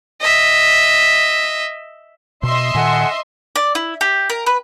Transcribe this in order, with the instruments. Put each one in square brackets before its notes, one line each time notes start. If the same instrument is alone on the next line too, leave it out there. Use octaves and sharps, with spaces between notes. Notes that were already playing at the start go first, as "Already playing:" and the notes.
[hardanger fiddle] D#5 E5
[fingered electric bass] B2 [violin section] D#5 E5 C6
[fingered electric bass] A#2 D#3 [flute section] A4 F#5 G#5
[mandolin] D5
E4
G4
A#4
B4